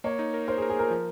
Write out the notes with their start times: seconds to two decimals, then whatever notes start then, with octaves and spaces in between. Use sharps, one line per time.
0.04 A#3 C#5
0.19 D#4
0.34 A#4
0.48 A#4 C5
0.58 G#4
0.62 A#4
0.69 G#4
0.76 A#3 A#4
0.91 F3